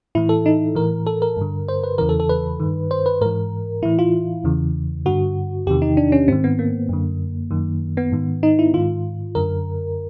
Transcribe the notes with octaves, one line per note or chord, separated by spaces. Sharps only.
A2 E3 E4
A4
D#4
A2 E3 A#4
A4
A#4
G2 D3
C5
B4
E2 C#3 E3 A#4
A4
A4
B4
G2 D#3
C5
B4
G#2 E3 A#4
A2 E3 E4
F4
E2 C#3 E3
G2 D3 F#4
E2 C3 D#3 G4
D#4
D4
C#4
G#2 D#3 C4
B3
A#3
F#2 D3
F#2 D#3
B3
G#2 D#3
D#4
E4
G#2 D#3 F4
F#2 D3 A#4